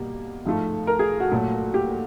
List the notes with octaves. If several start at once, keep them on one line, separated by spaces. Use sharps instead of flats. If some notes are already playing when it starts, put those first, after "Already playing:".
Already playing: B2 G3 A#3
G#2 F3 A3
A#4
G#4
F#4
A#2 F#3 A3
G4